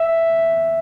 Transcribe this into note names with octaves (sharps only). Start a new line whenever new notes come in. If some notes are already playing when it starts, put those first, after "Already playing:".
Already playing: E5